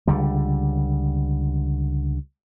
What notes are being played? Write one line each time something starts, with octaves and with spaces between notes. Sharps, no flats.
C#2 D3 G3